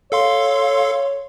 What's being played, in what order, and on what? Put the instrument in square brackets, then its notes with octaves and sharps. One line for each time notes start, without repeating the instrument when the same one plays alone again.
[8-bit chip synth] A4 F5 C6 [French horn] C#5